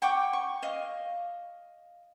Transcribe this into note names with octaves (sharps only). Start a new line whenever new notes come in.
F#5 G5 C#6 D6
C#6
D#5 F5